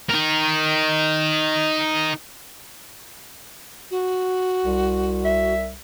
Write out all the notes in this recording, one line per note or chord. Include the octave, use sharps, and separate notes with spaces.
D#4 A#4
F#4
C2
E5